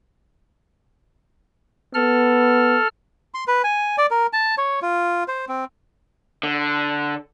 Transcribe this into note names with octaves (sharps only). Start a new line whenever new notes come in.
B3 A4 F6
C6
B4
G#5
D5
A#4
A5
C#5
F4
C5
C4
D3